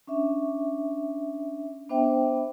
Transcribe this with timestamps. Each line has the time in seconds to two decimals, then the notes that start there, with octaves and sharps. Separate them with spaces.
0.07 C#4 D4 E5
1.89 B3 D4 C5 E5 G5